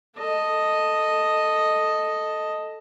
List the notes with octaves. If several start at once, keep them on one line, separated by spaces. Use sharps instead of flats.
A4 D#5